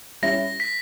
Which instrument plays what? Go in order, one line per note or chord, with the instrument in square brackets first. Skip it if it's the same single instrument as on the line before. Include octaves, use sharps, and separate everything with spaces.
[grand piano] G3 C#4 E4 [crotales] A#6
[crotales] B6